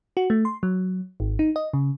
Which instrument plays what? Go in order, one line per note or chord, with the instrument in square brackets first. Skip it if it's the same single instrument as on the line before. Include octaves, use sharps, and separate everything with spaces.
[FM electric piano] F#4
A3
C6
F#3
G#1
D#4
D#5
C#3